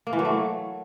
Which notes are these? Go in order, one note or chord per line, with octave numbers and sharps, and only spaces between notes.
A#3
E3
F#3
A3